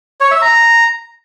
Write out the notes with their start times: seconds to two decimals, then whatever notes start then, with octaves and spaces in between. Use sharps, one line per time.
0.20 C#5
0.31 E5
0.42 A#5